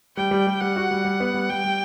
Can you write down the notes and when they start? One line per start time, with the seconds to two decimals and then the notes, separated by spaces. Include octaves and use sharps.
0.17 G3 G5
0.31 G3
0.47 G3
0.61 G3 F#5
0.76 F#4
0.91 G3
1.05 G3
1.20 B3
1.34 G3
1.49 G3 G5
1.64 G3